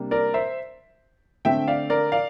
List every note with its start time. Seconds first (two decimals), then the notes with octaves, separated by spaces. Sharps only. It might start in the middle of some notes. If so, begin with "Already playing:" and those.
Already playing: C3 G3 A#3 D4
0.11 A#4 D5
0.34 C5 E5
1.45 D3 A3 C4 E5 G5
1.68 D5 F5
1.90 A#4 D5
2.12 D5 F5